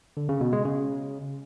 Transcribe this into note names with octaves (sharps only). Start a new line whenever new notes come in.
D3
C#3
B2
G#3
C#3